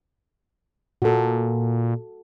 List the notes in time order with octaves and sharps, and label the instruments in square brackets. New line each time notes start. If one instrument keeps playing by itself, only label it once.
[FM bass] A#2 [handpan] F#4 A4